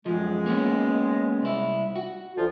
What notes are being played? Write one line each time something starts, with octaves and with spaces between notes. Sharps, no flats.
F#2 F3 G#3
A#3 B3 C#4
C2 E4
F#4
D2 F3 F4